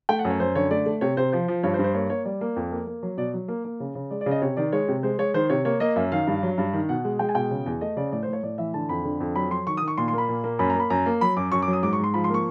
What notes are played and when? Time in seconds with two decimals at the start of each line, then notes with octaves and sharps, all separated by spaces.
0.09 A3 G5
0.19 F#5
0.25 F#2
0.30 C#5
0.40 F#2 C5
0.55 D3 C#5
0.71 A3 D5
0.86 A3
1.01 C3 C#5
1.17 C3 C5
1.32 F3 C5
1.48 F3
1.64 G2 C#5
1.74 C5
1.79 G2
1.84 C5
1.94 A#3 C#5
2.09 A#3 C#5
2.25 G3 D5
2.41 A#3
2.56 F2
2.71 A#3
2.87 A#3
3.03 F#3
3.17 B2 D5
3.34 F#3
3.48 A#3
3.65 A#3
3.80 C#3
3.95 C#3
4.11 G#3 D5
4.21 D5
4.26 C#3
4.31 D#5
4.42 C3 C#5
4.57 D#3 D5
4.72 G#3 C#5
4.88 C3
5.03 G#3 C5
5.19 G#3 C#5
5.34 D#3 C5
5.50 C3 C#5
5.65 A#3 C#5
5.80 A#3 D#5
5.96 F#2 E5
6.12 D#3 F5
6.27 G2
6.43 F#3
6.58 G2
6.73 D#3
6.89 B2 F#5
7.04 G#3
7.19 G#3 G5
7.29 G#5
7.35 B2 G5
7.51 C#3
7.66 E2
7.81 A3 D#5
7.97 C#3 D5
8.12 A2 D5
8.23 C5
8.27 A2
8.33 C#5
8.43 A2 D5
8.58 E3 E5
8.74 D3 A5
8.89 F2 B5
9.05 D3
9.20 F2
9.36 F#3 B5
9.51 F#3 C6
9.67 D#3 C#6
9.77 D#6
9.82 D#3
9.88 C#6
9.98 A#2 C6
10.08 C6
10.13 A#3 B5
10.29 A#2
10.44 A#3
10.59 F#2 B5
10.70 A#5
10.75 A#3 B5
10.90 F#2 A#5
11.06 A#3
11.21 F#3 B5
11.37 F#2 D6
11.52 F#2 C#6
11.62 D6
11.68 F#3
11.73 D#6
11.83 G#2 D6
11.93 C#6
11.98 G#2
12.04 C6
12.14 F3 B5
12.24 C6
12.30 A#3 C#6